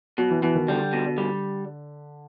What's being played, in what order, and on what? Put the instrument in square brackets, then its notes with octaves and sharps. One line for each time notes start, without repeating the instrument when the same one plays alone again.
[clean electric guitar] B2 [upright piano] F#3
[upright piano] E3
[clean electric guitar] B2 [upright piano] E3
[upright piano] D#3
[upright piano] D3 [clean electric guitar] G3
[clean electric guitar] B2
G3